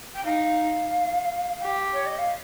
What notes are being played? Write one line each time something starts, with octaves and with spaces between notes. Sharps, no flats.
G5
D#4 F5
G4
C#5
D#5
F5